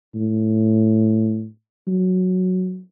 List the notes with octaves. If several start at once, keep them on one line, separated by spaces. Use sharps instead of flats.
A2
F#3